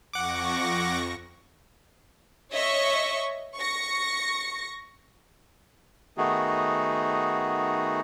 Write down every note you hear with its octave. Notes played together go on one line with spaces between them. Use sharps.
F2 F#5 C#6 D6 A#6
C#5 D#5 E5 C#6
C#6 A#6 C#7
D#3 A3 B3 D#4 F#4 G#4